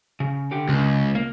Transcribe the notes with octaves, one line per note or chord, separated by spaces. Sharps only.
C#3
D3 G4
C#2 C#3
A#3